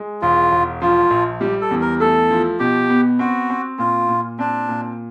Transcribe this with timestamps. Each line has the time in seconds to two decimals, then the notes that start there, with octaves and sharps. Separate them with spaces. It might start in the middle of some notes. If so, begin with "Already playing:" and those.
Already playing: G#3
0.22 E1 F4
0.52 E1
0.82 F3 F4
1.11 A#1
1.41 G3 G4
1.61 A4
1.71 E2
1.81 A#4
2.00 A3 A4
2.31 F3
2.60 B2 G4
2.90 B3
3.19 C4 F#4
3.50 C4
3.79 A#2 F4
4.09 A#2
4.39 C4 D4
4.69 A#2